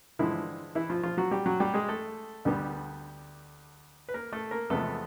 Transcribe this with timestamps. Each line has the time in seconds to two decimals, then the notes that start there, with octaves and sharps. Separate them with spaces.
0.19 G2 D3 E3 F3 G#3 E4
0.75 E3 E4
0.90 F3 F4
1.03 F3 F4
1.17 F#3 F#4
1.31 G3 G4
1.46 F#3 F#4
1.60 G3 G4
1.74 G#3 G#4
1.89 A3 A4
2.45 D2 D3 G3 B3
4.09 B4
4.14 A#3 A#4
4.32 A3 A4
4.51 A#3 A#4
4.70 E2 C3 F3 G#3 A3 B3 A4